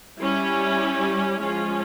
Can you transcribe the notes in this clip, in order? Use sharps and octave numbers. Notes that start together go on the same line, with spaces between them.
G3 C#4 E4
F3 G#3 C#4 F4